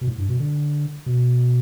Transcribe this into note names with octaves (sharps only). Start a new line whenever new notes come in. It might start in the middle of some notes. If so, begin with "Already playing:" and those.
B2
A2
G2
B2
D3
B2